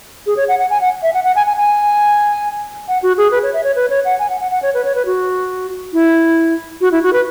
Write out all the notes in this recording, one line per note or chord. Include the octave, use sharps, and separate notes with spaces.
G#4
C#5
F#5
F#5
G#5
F#5
E5
F#5
F#5
G#5
G#5
G#5
F#5
F#4
G#4
B4
C#5
E5
C#5
B4
C#5
F#5
G#5
F#5
F#5
F#5
C#5
B4
C#5
B4
F#4
E4
F#4
E4
F#4
B4